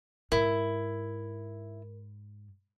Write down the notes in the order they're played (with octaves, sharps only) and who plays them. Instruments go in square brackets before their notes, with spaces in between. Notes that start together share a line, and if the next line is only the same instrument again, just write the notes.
[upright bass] G#2 [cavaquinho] E4 [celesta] A#4